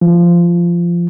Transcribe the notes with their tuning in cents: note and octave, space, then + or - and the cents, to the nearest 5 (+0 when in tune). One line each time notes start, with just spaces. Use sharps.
F3 -15